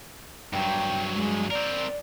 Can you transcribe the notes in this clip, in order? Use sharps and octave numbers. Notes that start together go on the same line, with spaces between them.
G2 F#3 G5
G#3
C4 A#4 D5